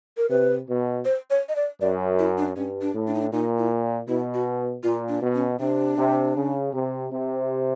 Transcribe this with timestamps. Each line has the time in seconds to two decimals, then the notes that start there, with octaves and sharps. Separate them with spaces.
0.17 A#4
0.29 C3 B4
0.68 B2
1.05 C5
1.30 C#5
1.49 D#5
1.56 D5
1.81 F#2 D5
2.19 E4
2.38 D4
2.56 G2 C#4
2.81 D4
2.94 A2
3.07 D4
3.14 D#4
3.21 D4
3.32 A#2 D#4
3.58 E4
4.08 B2 E4
4.34 F#4
4.83 A#2 F4
5.08 D4
5.21 B2
5.34 C#4
5.59 C3 D4
5.97 C3
6.36 C#3
6.73 C3
7.11 C3